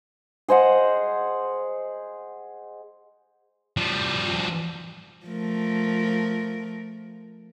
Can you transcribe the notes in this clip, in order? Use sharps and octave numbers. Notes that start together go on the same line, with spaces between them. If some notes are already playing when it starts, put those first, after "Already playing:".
G#4 C5 D#5 F#5
F3 G3
F3 A3 A#4